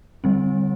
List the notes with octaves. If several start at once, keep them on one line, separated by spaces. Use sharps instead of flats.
D3 G3 C4